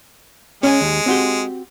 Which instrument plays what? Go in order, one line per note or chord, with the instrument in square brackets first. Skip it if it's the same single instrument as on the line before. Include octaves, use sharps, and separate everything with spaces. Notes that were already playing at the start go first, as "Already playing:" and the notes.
[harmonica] G#3 [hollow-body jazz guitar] C#4 G#5
[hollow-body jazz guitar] D#2
C4 F#4 G4